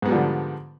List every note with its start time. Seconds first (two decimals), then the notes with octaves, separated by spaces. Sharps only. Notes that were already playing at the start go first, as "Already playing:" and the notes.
0.02 G#2
0.06 B3
0.09 G3
0.12 F3
0.15 D3